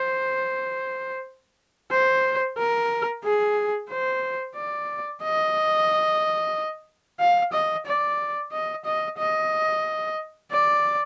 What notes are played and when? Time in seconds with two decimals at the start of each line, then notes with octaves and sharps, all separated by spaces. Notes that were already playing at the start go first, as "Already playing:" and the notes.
Already playing: C5
1.91 C5
2.59 A#4
3.24 G#4
3.89 C5
4.56 D5
5.23 D#5
7.20 F5
7.53 D#5
7.86 D5
8.52 D#5
8.85 D#5
9.18 D#5
10.51 D5